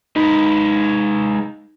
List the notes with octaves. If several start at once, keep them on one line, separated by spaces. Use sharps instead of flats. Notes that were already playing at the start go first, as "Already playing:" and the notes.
G#3 D#4 B4